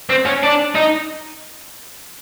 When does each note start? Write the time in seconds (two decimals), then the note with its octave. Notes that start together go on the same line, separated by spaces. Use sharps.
0.09 C4
0.26 C#4
0.43 D4
0.75 D#4